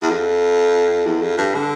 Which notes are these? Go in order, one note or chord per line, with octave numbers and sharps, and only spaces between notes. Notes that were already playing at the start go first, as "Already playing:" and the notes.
E2
F2
E2
F2
G2
D3